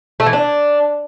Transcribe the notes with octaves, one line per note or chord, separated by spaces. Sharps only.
A3
E3
D4